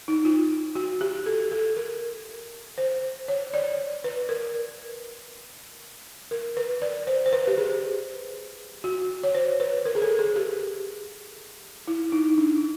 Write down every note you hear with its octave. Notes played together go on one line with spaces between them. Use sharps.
D#4
F4
F#4
G4
A4
A4
A#4
C5
C#5
D5
B4
A#4
A#4
B4
D5
C5
C5
B4
G4
G#4
F#4
C#5
C5
B4
A#4
G#4
A4
G#4
G4
E4
D#4
D4